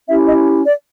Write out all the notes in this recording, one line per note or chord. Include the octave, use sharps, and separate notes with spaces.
C#4 E4 G4 E5
D#5
D5